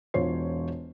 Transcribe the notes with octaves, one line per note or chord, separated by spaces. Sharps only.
E1 F4 C5 C#5 C7